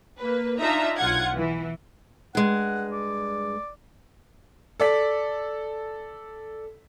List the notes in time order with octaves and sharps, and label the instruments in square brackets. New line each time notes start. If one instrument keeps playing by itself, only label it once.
[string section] A#3 B4
D4 D#4 F4 E5 A#5
B1 F4 F#5 G#6
E3
[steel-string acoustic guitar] G2 G#3 [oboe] F#5
[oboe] D5
[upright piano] A4 D5 B6